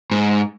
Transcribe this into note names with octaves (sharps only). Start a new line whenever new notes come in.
G#2